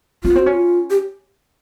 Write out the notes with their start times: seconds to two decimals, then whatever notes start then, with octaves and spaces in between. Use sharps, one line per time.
0.24 C4 F4
0.30 B3
0.35 C4 F#4
0.46 C#4
0.53 F4
0.90 G4